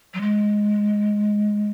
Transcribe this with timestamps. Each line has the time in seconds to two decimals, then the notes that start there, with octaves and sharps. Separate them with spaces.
0.14 F#3
0.21 G#3